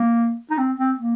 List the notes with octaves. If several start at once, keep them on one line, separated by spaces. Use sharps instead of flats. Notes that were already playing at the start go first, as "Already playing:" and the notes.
Already playing: A#3
D#4
C4
C4
A#3